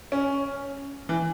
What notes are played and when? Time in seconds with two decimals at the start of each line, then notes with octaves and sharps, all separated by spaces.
0.12 C#4
1.09 E3